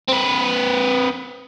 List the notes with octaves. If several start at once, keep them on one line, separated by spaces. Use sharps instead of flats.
C4 B4